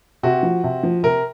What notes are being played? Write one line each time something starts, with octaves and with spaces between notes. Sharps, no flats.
C3 F#4
F3
C3
F3
C3 A#4